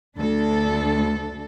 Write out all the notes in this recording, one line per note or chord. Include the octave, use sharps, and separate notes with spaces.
D2 D4 A4